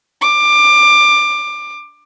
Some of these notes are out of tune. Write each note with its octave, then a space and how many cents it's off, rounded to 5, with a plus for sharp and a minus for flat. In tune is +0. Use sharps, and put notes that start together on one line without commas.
D6 +20